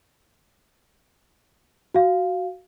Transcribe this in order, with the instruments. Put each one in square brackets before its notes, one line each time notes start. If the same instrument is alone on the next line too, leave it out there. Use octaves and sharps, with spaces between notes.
[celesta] F#4 F5